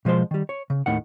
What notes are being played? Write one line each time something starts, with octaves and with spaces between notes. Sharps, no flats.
B2 F3 G#3 C5 C6
D#3 G3
C#5
C#3
D#2 A2 D#3 F#5